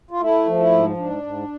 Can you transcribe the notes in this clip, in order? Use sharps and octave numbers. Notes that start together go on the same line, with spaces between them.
F4
A3 E4
F3
E4
G#2
G#2 D4
G#2